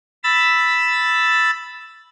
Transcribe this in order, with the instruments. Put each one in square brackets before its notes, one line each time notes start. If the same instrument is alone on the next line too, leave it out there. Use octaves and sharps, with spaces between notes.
[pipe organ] B5 E6 A6